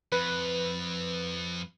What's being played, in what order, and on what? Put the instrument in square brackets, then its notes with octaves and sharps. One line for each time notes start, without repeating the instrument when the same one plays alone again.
[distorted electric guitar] F2 [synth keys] B4